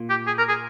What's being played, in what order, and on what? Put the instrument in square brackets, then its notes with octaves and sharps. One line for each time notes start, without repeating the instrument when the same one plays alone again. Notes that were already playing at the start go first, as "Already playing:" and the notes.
Already playing: [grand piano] A#2
[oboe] G4
G#4
A#4
G#4